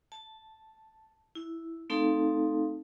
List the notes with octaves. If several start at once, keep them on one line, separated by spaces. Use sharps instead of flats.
A5
E4
A3 C4 D#4 A4 F5 A5